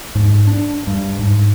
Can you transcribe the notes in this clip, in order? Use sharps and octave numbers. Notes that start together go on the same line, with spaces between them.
G#2
D4
G2
G#2